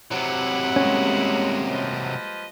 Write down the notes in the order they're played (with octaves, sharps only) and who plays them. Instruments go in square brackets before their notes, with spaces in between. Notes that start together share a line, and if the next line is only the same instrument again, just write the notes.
[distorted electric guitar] C3 F#3 [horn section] E4 F#5
[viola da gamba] G3 G#3 A#3 [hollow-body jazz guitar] C#4
[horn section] F3 B4 D#5